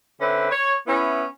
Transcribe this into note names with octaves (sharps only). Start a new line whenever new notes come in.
D3 C4 C#4 B4 E5
C#5
B3 C#4 E4